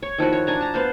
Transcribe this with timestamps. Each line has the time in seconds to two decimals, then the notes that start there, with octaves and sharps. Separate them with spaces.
0.02 C#5
0.18 D#3 F3 E4 F#4
0.33 C#5
0.47 D4 G#5 A#5
0.61 A5 A#5
0.74 B3 C5 F5